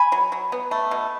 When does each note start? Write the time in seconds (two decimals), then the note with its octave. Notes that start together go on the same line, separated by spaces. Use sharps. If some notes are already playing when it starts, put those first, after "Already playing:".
Already playing: G#5 B5
0.12 F#3
0.32 F#3
0.52 B3
0.71 A3
0.91 B2